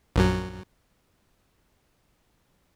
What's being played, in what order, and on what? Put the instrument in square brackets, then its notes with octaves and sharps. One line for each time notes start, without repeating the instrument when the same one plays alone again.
[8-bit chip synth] A#1 F#2 F#3